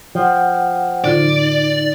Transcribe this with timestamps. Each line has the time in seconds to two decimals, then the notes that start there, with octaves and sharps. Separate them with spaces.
0.15 F3 F#5 G5
1.04 A2 D3 D#4 F4 D5